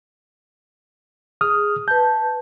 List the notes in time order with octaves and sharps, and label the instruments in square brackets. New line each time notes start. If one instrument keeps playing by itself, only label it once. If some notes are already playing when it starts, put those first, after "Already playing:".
[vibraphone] G#4 [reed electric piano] D#6 F6
[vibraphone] B4 A5 [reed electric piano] G6